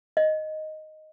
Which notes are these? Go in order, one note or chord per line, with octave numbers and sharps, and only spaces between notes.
D#5